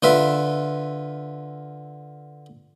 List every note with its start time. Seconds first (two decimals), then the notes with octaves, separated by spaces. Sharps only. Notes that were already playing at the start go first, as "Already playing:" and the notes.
0.03 D3 F4 B4 E5